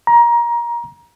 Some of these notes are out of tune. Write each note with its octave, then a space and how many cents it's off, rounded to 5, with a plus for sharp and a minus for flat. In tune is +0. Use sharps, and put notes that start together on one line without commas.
A#5 +20